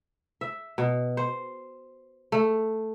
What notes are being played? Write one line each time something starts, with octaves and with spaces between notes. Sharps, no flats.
E5
B2
C5
A3